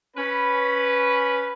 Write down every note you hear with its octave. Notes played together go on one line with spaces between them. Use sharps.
C#4 B4